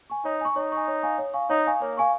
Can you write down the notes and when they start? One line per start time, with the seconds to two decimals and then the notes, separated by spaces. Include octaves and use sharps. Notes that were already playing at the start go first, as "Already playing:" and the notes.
0.10 G#5 C#6
0.25 D#4 C#5
0.41 G#5 C#6
0.56 D#4 C#5
0.72 G#5 C#6
0.88 C#5
1.03 F5 G#5 C#6
1.18 C#5
1.34 F5 G#5 C#6
1.50 D#4 C#5
1.66 F5 G#5 C#6
1.81 A#3 C#5
1.97 F5 G#5 C#6